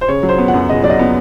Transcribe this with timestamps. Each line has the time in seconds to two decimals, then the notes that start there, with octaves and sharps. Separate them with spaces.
0.01 C5
0.08 C#3 C#5
0.23 F#3
0.29 C5
0.38 B3
0.48 F#5
0.54 F#2
0.69 C#3 D#5
0.84 F#3 D5
0.90 D#5
0.99 B3